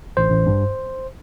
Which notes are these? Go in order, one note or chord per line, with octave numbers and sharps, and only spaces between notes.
A1 C5
A1
G2